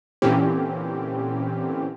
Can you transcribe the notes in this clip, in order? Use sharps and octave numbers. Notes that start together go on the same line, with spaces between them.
A#2 D3 E3 C4 C#4 G4